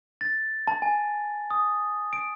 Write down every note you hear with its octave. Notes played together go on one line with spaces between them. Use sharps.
A6
A5
G#5
D#6
D7